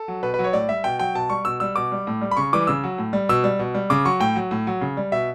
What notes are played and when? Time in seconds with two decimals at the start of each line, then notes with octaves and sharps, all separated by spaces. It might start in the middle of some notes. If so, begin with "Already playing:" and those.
Already playing: A4
0.08 F#3
0.23 B2 B4
0.34 B4
0.39 F#3
0.44 C#5
0.53 A2 D5
0.69 G3 E5
0.84 B2 G5
0.99 F#3 G5
1.15 B2 A5
1.30 G3 C#6
1.45 B2 E6
1.60 G3 E6
1.76 B2 D6
1.92 G3
2.07 A2
2.21 G3
2.31 B5
2.37 C#3 C#6
2.53 E3 G3 D6
2.67 C#3 E6
2.84 F#3
2.98 A2
3.13 G3
3.29 B2 E6
3.44 G3
3.59 B2
3.74 G3
3.90 C#3 D6
4.05 F#3 C#6
4.20 A2 G5
4.36 F#3
4.51 A2
4.67 F#3
4.81 C#3
4.97 G3
5.12 B2 E5